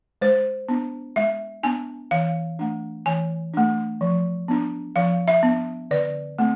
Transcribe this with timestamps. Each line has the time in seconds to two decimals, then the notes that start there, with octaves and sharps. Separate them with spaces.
0.22 G#3 C5
0.69 B3 D4
1.16 G#3 E5
1.63 B3 D4 G#5
2.11 E3 F5
2.59 A3 D4
3.06 E3 G#5
3.54 A3 D4
4.01 F3
4.48 B3 D4
4.96 F3 F5
5.28 E5
5.43 B3 D4
5.91 D3 D5
6.39 A3 C4